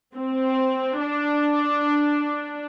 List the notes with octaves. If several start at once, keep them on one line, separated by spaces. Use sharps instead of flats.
C4
D4